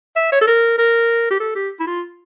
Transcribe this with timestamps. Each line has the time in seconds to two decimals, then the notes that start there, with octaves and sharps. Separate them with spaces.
0.16 E5
0.32 C#5
0.41 A4
0.47 A#4
0.78 A#4
1.30 G4
1.40 A4
1.55 G4
1.80 E4
1.87 F4